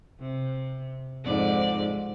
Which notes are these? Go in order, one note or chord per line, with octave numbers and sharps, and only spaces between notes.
C3
F2 G#2 D5